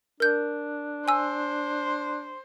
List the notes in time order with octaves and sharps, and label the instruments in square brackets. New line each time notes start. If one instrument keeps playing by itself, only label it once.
[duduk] D4 [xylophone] A#4 G6
[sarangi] C5 [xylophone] G#5 E6